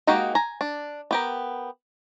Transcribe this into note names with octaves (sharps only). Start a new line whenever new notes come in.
G#3 A#3 D#4 F#4 G4
G#5 A#5
D4
B3 G4 A#4